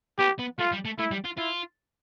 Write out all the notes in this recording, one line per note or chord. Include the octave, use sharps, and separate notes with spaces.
B3 G4
B3
A3 F4
G3
A3
A3 E4
G3
F4
E4 F4